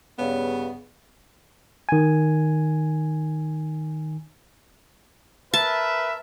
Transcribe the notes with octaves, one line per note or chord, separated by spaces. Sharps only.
G2 C#3 B3
D#3 G#5
A#4 B4 E5 A5